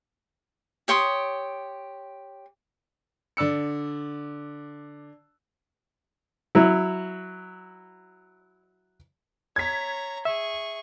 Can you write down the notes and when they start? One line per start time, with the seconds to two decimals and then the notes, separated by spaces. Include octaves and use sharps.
0.88 G4 C#5 C6 D#6
3.37 D3 D5 E6 C#7
6.55 F#3 E4
9.56 C#5 A#5 G#6 B6
10.25 G#4 E5 C#6